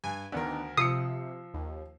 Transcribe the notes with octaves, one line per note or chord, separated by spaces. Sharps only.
G2 G#5
D2 D#3 B3 D4 A#4
C3 F3 D#6 E6 C7 C#7
D#2